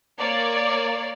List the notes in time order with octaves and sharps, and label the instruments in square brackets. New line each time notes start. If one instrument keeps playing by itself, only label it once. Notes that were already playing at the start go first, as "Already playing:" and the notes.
[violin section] A#3 C#5 D5